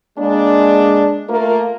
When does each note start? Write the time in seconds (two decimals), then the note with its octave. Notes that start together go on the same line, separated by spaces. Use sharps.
0.18 G#3 A#3 D4
1.29 A3 A#3 F4 A#4